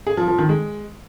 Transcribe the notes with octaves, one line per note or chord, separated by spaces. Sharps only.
G#4
F3
F3
D#3
G#3